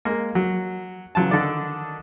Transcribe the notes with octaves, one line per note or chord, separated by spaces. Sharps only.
G#3 A#3
F#3
E2 C#3 F#3 F4 A5
D3 D#3 D4 A4 D5